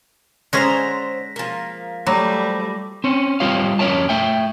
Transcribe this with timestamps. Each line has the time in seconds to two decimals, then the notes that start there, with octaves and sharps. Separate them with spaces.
0.53 D3 G#3 C#4 G#4 C5 A#5 A#6 B6
1.36 F3 A#3
2.07 F#3 G3 A3 B5 D6 A#6
3.04 C4 C#4
3.40 G3 C4 F4 G4 C#5 F5
3.79 F2 C#4 A#4 C#5 E5 A5
4.09 A3 E5 G5